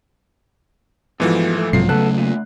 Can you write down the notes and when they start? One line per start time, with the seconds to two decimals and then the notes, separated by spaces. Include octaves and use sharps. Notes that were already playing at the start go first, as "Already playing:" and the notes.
1.20 G#2 B2 E3 F3 A3
1.58 A3
1.73 B1 G#2 C3 F3 F#3 C7
1.89 C#3 A3 B3 A4 F#6
2.18 A#2